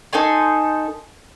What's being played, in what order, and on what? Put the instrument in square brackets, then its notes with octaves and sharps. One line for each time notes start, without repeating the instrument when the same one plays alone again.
[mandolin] D#4 A4 G#5 C6